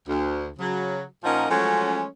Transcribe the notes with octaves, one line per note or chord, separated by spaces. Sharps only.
D2
C#3 F#3
A#2 F3 C#4 D#4 A#4 F#5
F3 F#3 G#3 A3 C#4